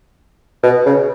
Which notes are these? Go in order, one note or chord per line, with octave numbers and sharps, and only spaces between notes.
B2
C#3